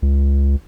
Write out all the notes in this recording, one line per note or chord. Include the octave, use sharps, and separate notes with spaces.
C#2